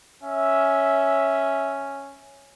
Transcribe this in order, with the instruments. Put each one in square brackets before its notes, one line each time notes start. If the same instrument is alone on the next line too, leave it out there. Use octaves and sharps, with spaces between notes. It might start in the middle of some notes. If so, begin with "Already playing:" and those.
[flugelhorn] C#4 [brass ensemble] E5